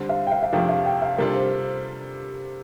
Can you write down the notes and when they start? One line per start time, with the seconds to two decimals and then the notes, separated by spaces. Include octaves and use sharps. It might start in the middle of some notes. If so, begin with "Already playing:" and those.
Already playing: D3 G3 C4
0.09 F5
0.27 G5
0.31 F5
0.43 F5
0.53 F2 C3 F3 A3 D4 G5
0.69 F5
0.86 G5
1.02 F5
1.18 C3 G3 D4 F4 A4 A#4
1.35 C5